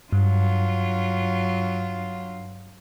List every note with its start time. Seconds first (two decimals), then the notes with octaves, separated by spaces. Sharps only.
0.13 G2 F#3 F4